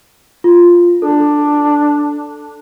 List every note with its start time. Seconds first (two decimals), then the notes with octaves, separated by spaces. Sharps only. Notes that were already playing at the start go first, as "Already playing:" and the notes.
0.44 F4
1.02 D4 A4